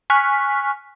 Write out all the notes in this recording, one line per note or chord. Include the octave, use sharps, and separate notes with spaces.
G#5 C#6 F6 F#6 B6